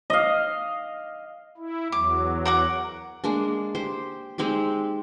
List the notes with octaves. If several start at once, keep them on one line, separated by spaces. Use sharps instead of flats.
D#5 F5
E4
E2 F#3 D6
A#4 F#5 D6
G#3 A#3 D4
G4 C5
G#3 C4 D#4 G4